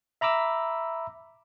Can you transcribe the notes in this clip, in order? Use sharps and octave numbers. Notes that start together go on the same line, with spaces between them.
E5 A#5 B5 D6 E6